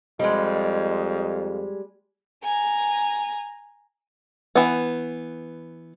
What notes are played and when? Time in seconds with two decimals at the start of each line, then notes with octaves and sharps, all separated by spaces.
0.19 F2 G3 G#3 D#5
2.43 G#5 A#5
4.55 E3 B3